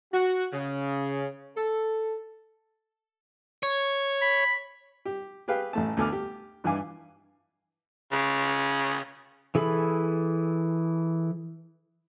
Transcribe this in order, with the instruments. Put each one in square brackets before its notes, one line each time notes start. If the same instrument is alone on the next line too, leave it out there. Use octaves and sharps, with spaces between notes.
[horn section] F#4
C#3
A4
[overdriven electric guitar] C#5
[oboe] B5
[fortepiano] G4
G4 G#4 B4 F5 G5
A1 A3 A5
D2 B3 A4 G#5 D6 F6
G4
G2 E3 E4 F5 G#5 D6
[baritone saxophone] C#3
[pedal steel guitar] E3 G#4 A4 B5